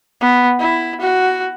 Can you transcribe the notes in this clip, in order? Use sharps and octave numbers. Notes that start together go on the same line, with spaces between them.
B3
E4
F#4